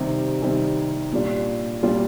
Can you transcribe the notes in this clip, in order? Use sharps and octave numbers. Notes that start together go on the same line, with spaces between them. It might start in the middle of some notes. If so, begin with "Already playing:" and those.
Already playing: C3 D#3 G3 C4
C3 D#3 G3 C4
A#2 G3 D4 F4
A#2 G3 D4 F4